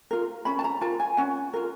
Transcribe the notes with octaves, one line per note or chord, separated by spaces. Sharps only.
F4 A#4
C#4 B5
A5
A#5
F4 A#4 A5
G#5
C#4 F#5
F4 A#4